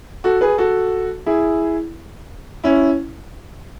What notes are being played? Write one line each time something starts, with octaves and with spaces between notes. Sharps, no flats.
F#4 A4
G#4 B4
F#4 A4
E4 G#4
C#4 E4